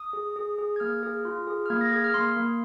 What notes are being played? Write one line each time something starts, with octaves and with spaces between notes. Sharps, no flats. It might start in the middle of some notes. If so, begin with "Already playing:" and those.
Already playing: D#6
G#4
G#4
G#4
G#6
A#3 F6
G#4
F4
G#4
F6
A#3 G#6
A#6
G#4 G#6
F6
A#3 C6
A#3